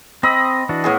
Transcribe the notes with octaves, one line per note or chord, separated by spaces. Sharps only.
C4 D#5 B5 E6
E3 D4 F#4
A2 B3 G#4